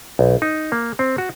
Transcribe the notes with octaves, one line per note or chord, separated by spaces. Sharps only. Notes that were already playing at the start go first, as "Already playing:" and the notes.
B1
D#4
A#3
C4
F#4